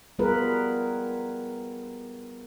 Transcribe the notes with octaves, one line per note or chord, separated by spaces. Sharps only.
G3 B3 F4 G#4 A#4 B4